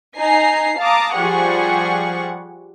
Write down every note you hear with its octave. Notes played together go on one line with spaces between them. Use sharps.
D#4 G#5 A#5 C7
F5 A5 A#5 D6 D#6
F3 G3 G#4 F#5 C#6